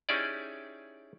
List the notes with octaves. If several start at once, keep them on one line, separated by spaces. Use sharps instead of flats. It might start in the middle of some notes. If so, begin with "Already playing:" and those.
C#4 D#4 E4 G4 G#4 D5